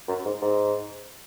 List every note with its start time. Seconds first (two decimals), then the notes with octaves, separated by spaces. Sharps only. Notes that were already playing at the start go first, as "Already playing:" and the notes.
0.08 F#2
0.25 G#2
0.42 G#2